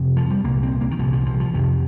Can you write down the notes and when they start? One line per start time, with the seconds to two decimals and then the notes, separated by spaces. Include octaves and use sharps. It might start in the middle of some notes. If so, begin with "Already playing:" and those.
Already playing: F2 C3
0.17 F3
0.30 G3
0.44 C2 A#2 A#3
0.62 C4
0.81 A#3
0.91 D#3
0.99 C2 A#2 F3
1.13 F3
1.26 F3
1.40 F3
1.54 F2 C3 D#3